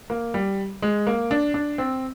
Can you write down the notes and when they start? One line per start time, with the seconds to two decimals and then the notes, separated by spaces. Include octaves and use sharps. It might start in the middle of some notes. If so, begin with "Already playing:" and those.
0.10 A#3
0.34 G3
0.82 G#3
1.07 A#3
1.31 D4
1.54 D4
1.78 C4